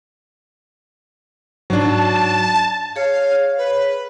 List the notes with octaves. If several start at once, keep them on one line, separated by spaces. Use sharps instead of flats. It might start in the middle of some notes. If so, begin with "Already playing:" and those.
G#2 F#3 D4 A5
G#4 C#5 F5
B4